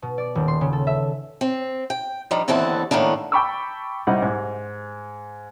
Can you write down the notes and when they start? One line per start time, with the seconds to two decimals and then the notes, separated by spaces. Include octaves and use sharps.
0.02 B2
0.18 D5
0.35 D#1
0.48 C6
0.61 C#3
0.73 A4
0.87 E5
1.41 C4
1.90 G5
2.31 F3 G3 D4 D#4
2.48 D#2 D3 E3 B3 C4 A5
2.91 A2 D#3 A#3 B3 D4
3.32 G5 A5 B5 C#6 D6 E6
4.07 C2 G3 D#4 F#5
4.22 G#2